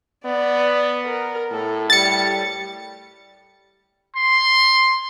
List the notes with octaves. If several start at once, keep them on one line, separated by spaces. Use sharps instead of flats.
B3 D5
A#4
A2 A4
G3 A6 C#7
C6